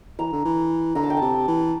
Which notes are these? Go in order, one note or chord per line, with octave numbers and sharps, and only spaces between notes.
E3 A#5
D3
E3
D3 A#5
A5
G5
C3 A5
E3